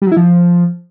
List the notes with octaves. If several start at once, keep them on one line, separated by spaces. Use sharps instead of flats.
G3
F#3
E4
F3